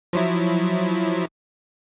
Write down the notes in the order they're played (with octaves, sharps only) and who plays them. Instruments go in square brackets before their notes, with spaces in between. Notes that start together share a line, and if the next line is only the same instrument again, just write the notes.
[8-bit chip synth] F3 F#3 E4